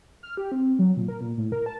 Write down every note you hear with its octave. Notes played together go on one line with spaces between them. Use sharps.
F6
G4
C4
F#3
A#2
A#4
A#2
A2
A#4
A5